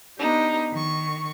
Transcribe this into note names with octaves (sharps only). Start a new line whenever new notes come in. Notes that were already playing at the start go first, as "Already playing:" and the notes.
B3 D4 D#4 G4
D#3 C#6